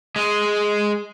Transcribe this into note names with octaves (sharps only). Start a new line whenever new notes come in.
G#3 G#4